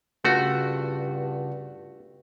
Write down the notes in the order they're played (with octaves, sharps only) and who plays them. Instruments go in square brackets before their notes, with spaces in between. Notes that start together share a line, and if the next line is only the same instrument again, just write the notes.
[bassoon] G2 [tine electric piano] C#3 F4 F#5 [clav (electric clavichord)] A3 F#4